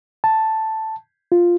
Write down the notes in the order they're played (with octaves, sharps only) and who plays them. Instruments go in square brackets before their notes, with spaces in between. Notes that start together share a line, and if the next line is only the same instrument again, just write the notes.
[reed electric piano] A5
F4